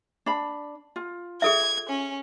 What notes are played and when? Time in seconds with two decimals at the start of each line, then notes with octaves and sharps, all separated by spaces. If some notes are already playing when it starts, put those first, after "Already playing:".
0.26 D4 B5
0.96 F4
1.42 G#4 A4 E5 G#6
1.89 C#4